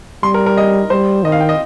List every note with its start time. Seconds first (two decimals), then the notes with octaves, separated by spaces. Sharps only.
0.23 G3 C6
0.34 A#4
0.46 A#4
0.57 D#5
0.90 G3 C5
1.24 D#3 D#5
1.32 F5
1.40 G5
1.49 D#5